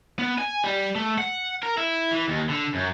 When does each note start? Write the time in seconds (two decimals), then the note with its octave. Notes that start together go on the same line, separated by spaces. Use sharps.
0.19 B3
0.38 G#5
0.64 G3
0.96 A3
1.18 F#5
1.63 A#4
1.77 E4
2.12 E3
2.28 D#2
2.49 D3
2.74 F#2